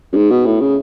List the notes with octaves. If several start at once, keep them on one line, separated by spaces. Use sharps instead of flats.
F#2
G#2
B2
A2
C#3